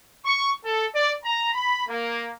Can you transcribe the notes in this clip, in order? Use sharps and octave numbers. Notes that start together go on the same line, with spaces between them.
C#6
A4
D5
A#5
B5
A#3